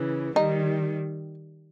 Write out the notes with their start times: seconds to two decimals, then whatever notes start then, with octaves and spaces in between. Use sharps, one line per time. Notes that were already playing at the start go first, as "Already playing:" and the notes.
Already playing: C#3 E3
0.35 D#3 G3 D#4